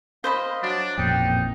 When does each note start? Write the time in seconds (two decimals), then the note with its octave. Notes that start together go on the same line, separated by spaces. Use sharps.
0.24 C5 D#5 F5 B5
0.62 F#3 D4
0.98 A1 F2 A#2 D#4 G5